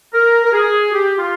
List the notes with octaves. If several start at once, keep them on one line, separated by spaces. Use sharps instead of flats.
A#4
A#4
G#4
G4
F4